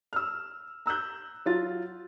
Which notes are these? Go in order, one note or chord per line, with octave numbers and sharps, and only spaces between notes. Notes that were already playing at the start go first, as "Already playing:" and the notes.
E6 F6
A#5 E6 F#6 G6
F#3 F4 A6